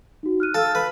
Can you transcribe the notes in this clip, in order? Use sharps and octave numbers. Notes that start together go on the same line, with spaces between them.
D#4 F#4
F6 F#6 D#7
A4 F5 E6 F6
B4